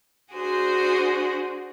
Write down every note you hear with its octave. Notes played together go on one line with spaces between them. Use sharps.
D4 F#4 G#4 C5